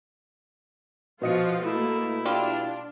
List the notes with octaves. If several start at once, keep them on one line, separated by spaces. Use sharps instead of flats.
B2 F3 F4 F#4 D#5 C#7
A3 A#3 E4
G3 D4 F4